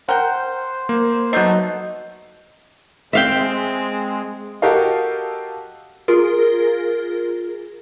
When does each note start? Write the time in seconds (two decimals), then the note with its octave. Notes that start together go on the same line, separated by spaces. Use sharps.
0.09 A#4 C5 F#5 G5
0.89 A#3
1.33 F#3 A3 B3 D#4 G6 C7
3.13 G#3 C4 E5 F5 G5
4.62 F#4 G4 A4 A#4 D#5 F5
6.08 F4 G#4 A#4